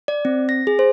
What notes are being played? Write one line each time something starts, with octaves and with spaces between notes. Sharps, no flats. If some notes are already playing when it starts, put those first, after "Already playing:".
D5
C4
A#6
G#4
C5